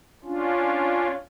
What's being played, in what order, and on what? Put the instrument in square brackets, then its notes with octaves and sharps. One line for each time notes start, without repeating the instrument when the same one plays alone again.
[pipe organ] C#4 D4 F4